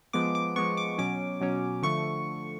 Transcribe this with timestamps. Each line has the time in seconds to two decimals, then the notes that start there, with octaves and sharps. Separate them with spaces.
0.13 F3 G#3 B3 D6
0.35 D6
0.56 F3 G#3 B3 C#6
0.77 D6
0.98 B2 F#3 C#4 D6
1.41 B2 F#3 C#4
1.83 D3 F3 A3 C#6